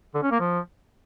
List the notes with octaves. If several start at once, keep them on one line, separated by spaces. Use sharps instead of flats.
D3
C#4
A#3
F3